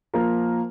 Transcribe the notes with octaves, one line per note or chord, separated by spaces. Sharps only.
F3 A#3 F4 A#4